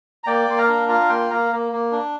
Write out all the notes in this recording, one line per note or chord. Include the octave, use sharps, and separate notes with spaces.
A#5
A#3 D5 G5
A#3 C6
F5 A#5
D4
F4 F5 A#5
A#3 G5 C6
A#3 F5 A#5
A#3
A#3
D4